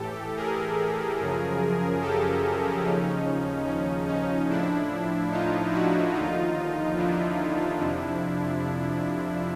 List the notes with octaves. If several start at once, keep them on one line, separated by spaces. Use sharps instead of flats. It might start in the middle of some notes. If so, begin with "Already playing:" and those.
Already playing: A2 E3 G4 A4
G#4 A#4
F#2 C#3 F3
G4 A4
D#2 C#3 F3 C#4 D#4
C#4
C#4 D#4
A2 F3 D4 E4
D#4 F4
E4 F#4
D#2 D3 F3 D#4 F4
D4 E4
F2 C3 F3